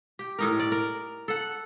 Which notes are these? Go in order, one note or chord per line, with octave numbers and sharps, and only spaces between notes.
G4
A2 D#4 A#4
D5
A#4
A4 F#5